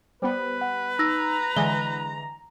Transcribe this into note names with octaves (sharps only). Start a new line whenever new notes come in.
G3 B3 B4 C5
F#5
D#4 A#5 E6 A#6
D3 E3 G#3 G7